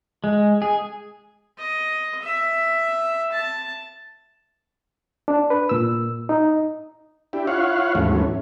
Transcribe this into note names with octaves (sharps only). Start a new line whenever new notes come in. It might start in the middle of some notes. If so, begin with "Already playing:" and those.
G#3
G#4
D#5
E5
A5
D4
B4
A#2 E6
D#4
D4 E4 G4
E4 F4 C#5 F5 F#5
D#2 G#2 E3 F#3 A3 C#4